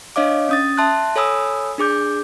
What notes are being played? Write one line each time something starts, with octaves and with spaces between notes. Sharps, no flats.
D4 C#5 D#5 F5 D6
C#4 D#6 A6
E5 A5 C6 F#6
A4 C#5 G#5 B5 D#6 E6
D4 G#4 D6 G6